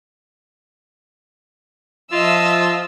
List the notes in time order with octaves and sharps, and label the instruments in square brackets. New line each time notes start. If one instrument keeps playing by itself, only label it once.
[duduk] F3 [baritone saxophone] F4 [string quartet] D#5 [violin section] E5 E6